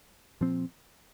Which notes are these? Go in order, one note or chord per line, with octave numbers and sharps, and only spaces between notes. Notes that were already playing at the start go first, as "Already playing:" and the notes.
A#2 F3 C4